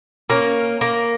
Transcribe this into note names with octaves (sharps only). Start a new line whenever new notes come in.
A#3 C#4
A#3